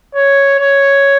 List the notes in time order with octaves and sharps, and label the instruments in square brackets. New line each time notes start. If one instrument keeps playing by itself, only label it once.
[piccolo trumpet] C#5
C#5